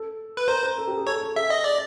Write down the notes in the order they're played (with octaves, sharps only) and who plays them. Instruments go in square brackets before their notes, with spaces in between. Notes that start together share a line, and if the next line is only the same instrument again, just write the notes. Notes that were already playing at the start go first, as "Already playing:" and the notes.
Already playing: [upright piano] A4
[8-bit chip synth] B4
[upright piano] A#4 [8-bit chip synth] C5
[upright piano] A#4
A4
G4
G#4
[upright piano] A4 [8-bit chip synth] C#5
[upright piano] A4
[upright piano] G#4 [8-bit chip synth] E5
[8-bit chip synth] D#5
D5